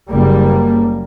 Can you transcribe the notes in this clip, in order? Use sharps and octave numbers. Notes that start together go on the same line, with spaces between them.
F#1 G3 A#3